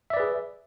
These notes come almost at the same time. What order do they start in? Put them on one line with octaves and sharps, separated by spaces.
E5 D5 B4 G#4